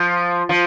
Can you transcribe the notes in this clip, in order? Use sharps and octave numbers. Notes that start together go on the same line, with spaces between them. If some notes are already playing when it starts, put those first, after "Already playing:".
Already playing: F3
F3